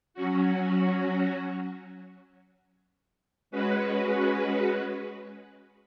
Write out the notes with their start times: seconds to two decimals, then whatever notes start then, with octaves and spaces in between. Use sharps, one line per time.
0.14 F#3 C#4 F#4
3.51 G#3 C#4 F#4 B4